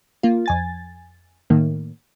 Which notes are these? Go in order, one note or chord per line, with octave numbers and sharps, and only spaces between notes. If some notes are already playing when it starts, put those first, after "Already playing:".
A#3 F4
F2 G#5 A6
A2 D#3 A#3